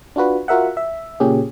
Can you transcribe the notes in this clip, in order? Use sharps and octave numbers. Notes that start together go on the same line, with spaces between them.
D4 F4 F#4 B4
F4 F#4 A#4 E5 F#5
E5
A#2 C#3 C#4 G4 G#4